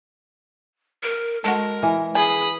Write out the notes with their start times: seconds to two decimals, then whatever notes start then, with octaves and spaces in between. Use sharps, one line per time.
1.03 A#4
1.44 G#3 F#4 A4 A#4
1.83 E3
2.15 G#4 G#5 B5 D#6